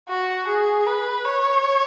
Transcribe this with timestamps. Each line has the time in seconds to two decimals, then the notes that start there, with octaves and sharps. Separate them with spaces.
0.09 F#4
0.48 G#4
0.87 B4
1.25 C#5